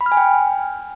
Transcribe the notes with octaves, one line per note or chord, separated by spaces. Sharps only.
B5
F6
G#5
G5